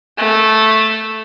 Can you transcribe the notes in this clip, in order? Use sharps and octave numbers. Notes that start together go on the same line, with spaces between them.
A3